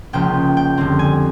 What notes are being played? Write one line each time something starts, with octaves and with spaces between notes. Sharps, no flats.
C#2 C#3 F3 A#3 G5
G5
F2 D3 G3 C4
G#5